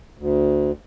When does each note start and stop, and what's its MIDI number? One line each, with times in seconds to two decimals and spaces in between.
0.17 0.71 38